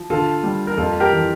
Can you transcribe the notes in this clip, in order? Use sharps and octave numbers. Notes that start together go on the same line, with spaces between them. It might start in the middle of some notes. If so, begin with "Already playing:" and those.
Already playing: F3
D3 F4 A4
G3
A#4
F2 F4 A4
G4 A#4
E3